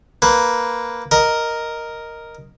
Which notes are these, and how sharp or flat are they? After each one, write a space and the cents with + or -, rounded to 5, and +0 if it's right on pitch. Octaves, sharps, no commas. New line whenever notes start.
A#3 +0 B4 +0
A#4 +0 D#5 +0